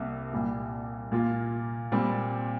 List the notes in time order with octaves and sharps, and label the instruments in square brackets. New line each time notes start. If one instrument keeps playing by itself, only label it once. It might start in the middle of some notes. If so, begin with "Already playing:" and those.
Already playing: [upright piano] C2 C3 A#3
C2 A#2 G3 A#3
A#2 A#3 F4
A#2 G3 C4